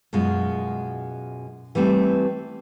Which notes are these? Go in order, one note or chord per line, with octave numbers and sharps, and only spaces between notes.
F#2 B2 G#3 F4
E3 G3 A3 C4